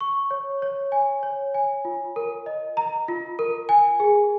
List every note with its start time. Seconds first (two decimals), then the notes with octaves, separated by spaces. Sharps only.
0.01 C#6
0.31 C#5
0.62 C#5
0.92 G#5
1.23 C#5
1.54 G#5
1.85 F4
2.16 A#4
2.46 D#5
2.77 A#5
3.08 F4
3.39 A#4
3.69 G#5
4.00 G#4